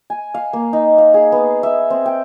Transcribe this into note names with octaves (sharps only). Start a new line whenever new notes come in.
G#5
F5
A#3
D#4
F5
G#4
B3
E5
C4
G5